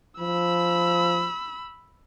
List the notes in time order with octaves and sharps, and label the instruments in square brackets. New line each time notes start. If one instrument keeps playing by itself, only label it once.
[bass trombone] F3 [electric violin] B5 E6